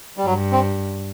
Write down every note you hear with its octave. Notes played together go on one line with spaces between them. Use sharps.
G3
G2 F#3
C4